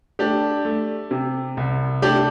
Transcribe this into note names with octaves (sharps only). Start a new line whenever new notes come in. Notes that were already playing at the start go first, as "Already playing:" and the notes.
A3 D4 G4
A3
C3
C2
A3 D4 G4